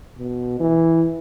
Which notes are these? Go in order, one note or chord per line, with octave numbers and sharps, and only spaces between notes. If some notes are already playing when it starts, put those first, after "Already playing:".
B2
E3